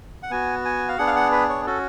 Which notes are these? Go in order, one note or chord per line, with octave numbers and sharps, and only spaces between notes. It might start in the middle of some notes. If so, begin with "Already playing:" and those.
F#5
B3 F#4 G#5
G#5
F5
B3 D4 G#4 F#5
F5
F#5
B4
C#5
C#4 F#4 A4